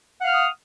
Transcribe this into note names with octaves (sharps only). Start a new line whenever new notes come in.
F5 F#5 D#6 F6